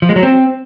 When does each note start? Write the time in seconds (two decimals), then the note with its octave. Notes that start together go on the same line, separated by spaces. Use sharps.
0.02 F3
0.09 G#3
0.16 F#3
0.23 C4